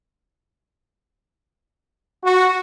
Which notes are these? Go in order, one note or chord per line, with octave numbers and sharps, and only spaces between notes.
F#4